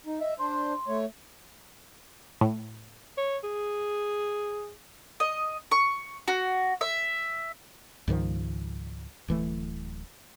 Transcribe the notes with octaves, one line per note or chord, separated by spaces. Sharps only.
D#4
D#5 E5
D4 C5 C6
A3 C#5
A2
C#5
G#4
D#5
C#6
F#4
E5
C#2 G#2 D#3 F3
D1 E3 A3